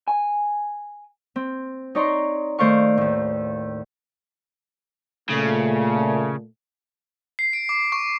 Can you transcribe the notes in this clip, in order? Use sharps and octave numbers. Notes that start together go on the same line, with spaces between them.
G#5
C4
D#4 C#5 D5 A#5 C6 C#6
D#3 A3 C5 D5 F5 C#6
D#2 A2
A#2 C#3 A3
C7
D7
D6
C#6